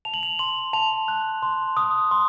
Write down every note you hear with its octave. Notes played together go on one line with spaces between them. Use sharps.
A5 F7
F#7
F7
C6 F#7
A5 F7
F#6
C6
D#6
C6